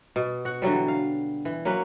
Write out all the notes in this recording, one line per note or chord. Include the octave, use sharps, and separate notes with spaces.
B2
F#4 F#5
D3 E3 F#3 G3
F5
E3
F#3 A#3 C#4 B4